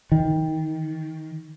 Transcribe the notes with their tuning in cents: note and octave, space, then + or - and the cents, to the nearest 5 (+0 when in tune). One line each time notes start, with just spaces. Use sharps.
D#3 +20